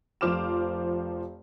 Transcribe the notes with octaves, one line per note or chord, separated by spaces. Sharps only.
F1 F3 C5 D6 F6 E7